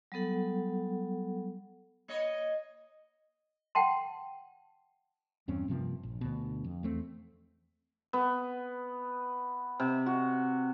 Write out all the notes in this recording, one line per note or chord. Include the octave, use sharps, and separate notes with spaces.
F#3 G3 B3 A4 F#5
A#3 C#5 D#5
F#5 G5 A5 C6
E2 G2 C4 C#4
G2 C3 F3 A#3
A#1
D2 B2
F2
E2 A3 C4
B3
C3
F#4